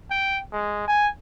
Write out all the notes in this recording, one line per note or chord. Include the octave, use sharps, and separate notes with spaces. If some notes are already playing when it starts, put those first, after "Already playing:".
G5
G#3
G#5